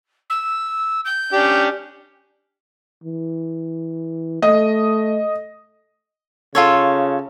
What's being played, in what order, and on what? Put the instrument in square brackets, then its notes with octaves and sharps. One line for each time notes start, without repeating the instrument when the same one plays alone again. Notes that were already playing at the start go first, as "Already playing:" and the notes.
[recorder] E6
G6
[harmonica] C#4 D4 G4
[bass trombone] E3
[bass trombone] A3 [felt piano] D#5
[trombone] C#3 [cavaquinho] F4 A4 C#5